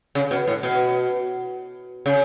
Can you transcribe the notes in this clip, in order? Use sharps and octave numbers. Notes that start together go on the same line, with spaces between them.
C#3
B2
A2
B2
C#3